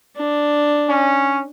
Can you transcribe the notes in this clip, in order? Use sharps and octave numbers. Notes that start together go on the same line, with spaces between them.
D4
C#4